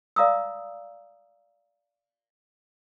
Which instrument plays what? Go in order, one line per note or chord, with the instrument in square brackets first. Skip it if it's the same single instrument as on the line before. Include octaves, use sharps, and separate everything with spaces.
[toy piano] D5 F5 A#5 D#6 E6